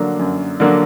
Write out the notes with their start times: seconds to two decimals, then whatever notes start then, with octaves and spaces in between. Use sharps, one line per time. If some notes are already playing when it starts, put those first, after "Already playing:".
Already playing: D3 F#3 A#3 D4
0.19 F#2
0.60 D3 F#3 A#3 D4